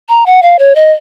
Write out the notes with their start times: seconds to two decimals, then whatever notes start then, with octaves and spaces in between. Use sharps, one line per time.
0.09 A#5
0.26 F#5
0.43 F5
0.59 C#5
0.75 D#5